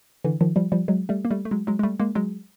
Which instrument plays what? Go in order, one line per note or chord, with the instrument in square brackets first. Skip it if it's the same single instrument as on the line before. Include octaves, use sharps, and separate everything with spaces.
[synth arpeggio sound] D3 E3
D#3 F3
F3 G3
F3 G3
F#3 G#3
G3 A3
A#3
G3 A3
A3
F#3 G#3
F#3 G#3
G#3
G3 A3
G#3 A#3
F#3 G#3